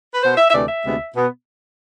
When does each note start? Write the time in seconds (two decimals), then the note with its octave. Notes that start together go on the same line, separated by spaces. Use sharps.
0.14 B4
0.23 B2 B3 C5
0.37 E5
0.49 E5
0.53 D2 C3 E3 A3 D5
0.68 E5
0.84 D2 C3 G#3 B3
1.15 B2 B3